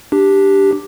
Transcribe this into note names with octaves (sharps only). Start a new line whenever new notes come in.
D4 G4